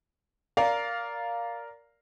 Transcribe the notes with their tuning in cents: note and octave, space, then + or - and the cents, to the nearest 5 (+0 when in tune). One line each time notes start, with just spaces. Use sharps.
A#4 +0 D5 -15 F5 +0